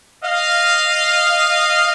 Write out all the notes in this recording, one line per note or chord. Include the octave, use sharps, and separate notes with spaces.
D#5 F5